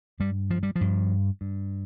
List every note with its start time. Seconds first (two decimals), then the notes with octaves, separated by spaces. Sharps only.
0.20 G2 G3
0.50 F3
0.63 G3
0.76 F3
0.81 G2
1.41 G2